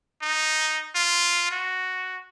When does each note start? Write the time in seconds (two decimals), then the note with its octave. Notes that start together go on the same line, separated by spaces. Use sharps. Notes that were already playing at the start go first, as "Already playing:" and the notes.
0.22 D#4
0.95 F4
1.51 F#4